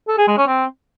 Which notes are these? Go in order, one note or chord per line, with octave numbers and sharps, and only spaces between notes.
A4
G#4
G#3
C#4
C4